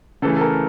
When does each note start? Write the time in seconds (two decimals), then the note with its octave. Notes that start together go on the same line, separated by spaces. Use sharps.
0.22 C#3 E3 A3 A4
0.37 A4
0.41 A#4